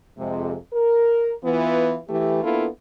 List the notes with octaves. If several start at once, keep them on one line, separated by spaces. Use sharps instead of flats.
F2 C3 G#3
A#4
E3 B3 F4
E3 A3 G4
A#3 B3 D4 E4 F4 A4